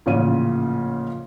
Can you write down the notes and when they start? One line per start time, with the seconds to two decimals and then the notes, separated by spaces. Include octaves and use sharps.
0.06 A1 A#2 C#3 F3 C#4 D#7